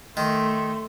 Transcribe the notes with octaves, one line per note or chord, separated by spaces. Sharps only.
D#3 A3 C6